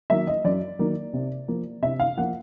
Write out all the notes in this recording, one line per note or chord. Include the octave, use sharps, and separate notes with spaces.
D#3 F#3 A#3 E5
D#5
F#2 D5
D#3 F#3 A#3
C3
F3 A#3
C3 E5
F5
F3 A#3 F#5